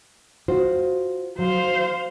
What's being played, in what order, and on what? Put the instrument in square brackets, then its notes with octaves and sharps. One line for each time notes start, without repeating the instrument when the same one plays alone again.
[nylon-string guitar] F4 F#4 C5
[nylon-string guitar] F#3 [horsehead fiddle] C5 F5